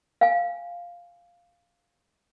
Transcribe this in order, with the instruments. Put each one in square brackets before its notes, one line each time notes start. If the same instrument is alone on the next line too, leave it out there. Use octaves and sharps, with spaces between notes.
[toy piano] F5 G#5